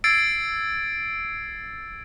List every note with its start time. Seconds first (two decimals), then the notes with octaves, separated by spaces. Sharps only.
0.04 E6 G#6 A6 C7 D7